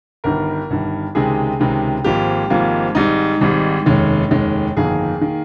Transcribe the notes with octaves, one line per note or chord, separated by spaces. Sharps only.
G1 G2 D#3 A#4
G1 G2 D#3
C#2 C3 D#3 G#3 G#4
C#2 C3 D#3 G#3
G#1 G#2 F3 A#3 G4
G#1 G#2 F3 A#3
G#1 G#2 G3 D#4
G#1 G#2 G3
F1 D#2 D#3 G#3 C#4
F1 D#2 D#3 G#3
G1 F2 D#3 A#3 G#4
D#3 A#3